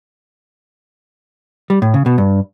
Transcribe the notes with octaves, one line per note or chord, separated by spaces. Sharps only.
G3
A2
C#3
B2
G2